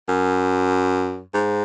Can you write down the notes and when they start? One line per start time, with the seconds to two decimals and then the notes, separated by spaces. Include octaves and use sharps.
0.09 F#2
1.34 G#2